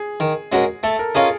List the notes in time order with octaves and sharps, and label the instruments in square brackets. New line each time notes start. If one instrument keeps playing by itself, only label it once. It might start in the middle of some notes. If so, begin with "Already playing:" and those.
Already playing: [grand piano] G#4
[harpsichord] D#3
G#3 C#4 F#4 A#4
[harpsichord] A3 [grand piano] A4
[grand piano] A#4
[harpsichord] C#4 F4 A#4 D#5 [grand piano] G#4